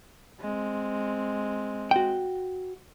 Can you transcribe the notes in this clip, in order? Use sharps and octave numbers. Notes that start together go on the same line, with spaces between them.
G#3 C4
F#4 G5